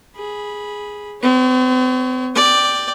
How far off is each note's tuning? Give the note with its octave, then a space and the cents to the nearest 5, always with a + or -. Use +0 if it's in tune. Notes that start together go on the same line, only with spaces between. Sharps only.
G#4 +0 B5 -10
C4 -45 C#5 +0
D5 +0 G5 +0